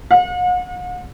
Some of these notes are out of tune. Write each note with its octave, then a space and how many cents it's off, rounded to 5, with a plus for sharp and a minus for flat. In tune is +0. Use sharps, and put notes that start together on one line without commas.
F#5 -45